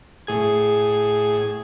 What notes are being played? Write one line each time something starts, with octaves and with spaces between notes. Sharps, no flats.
A2 G#4 G#6